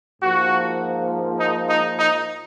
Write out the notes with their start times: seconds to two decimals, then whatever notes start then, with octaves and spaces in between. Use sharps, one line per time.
0.22 G#2 F3 A#3 F#4
1.39 D#4
1.69 D#4
1.98 D#4